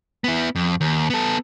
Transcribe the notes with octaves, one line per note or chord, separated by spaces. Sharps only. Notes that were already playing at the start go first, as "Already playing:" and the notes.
B3 E4
F2
D#2
B3 A4